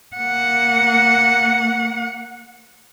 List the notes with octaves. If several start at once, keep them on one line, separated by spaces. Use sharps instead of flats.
A#3 F#5